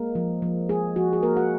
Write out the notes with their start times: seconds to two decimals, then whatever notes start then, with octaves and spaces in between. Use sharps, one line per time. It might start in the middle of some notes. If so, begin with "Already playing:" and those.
Already playing: G#3 A#3 A#4
0.15 F3
0.42 F3
0.69 G#3 G#4
0.96 F3 F#4
1.13 G#4
1.23 A#3 A#4
1.36 F#4 F#5